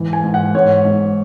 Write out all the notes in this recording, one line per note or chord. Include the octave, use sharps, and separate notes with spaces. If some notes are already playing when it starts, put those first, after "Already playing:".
Already playing: G#2 E3
G#5
G#2
F#5
G#2 C#5
G#2